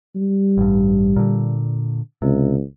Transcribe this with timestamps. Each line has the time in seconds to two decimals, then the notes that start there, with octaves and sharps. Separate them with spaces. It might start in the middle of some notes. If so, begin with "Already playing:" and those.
0.15 G3
0.58 A1 G2
1.16 A#2 D3
2.22 C#2 C3